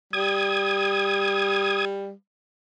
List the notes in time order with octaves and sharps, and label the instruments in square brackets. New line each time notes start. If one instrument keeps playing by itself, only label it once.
[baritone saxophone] G3 [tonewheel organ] D#6 G#6